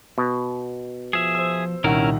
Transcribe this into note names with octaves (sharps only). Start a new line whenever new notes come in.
B2
F3 G#4 E5
C5 E6
C2 A#2 D#3 C#4 E4 A#4 F#5